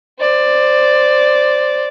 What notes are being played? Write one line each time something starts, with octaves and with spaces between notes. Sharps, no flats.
C5 D5